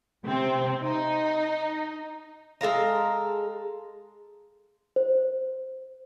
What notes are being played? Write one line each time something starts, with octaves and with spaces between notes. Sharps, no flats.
C3 C4
D#4
G#3 A4 F5 A#5
C5